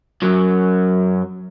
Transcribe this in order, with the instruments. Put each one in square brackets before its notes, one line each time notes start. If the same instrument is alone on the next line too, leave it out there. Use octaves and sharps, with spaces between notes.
[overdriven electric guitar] F#2 F#3